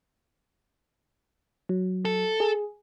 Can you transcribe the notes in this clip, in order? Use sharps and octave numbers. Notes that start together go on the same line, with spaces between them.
F#3
A4
G#4